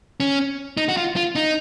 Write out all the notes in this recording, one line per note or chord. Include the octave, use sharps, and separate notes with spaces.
C#4
D#4
F#4
F4
F4
D#4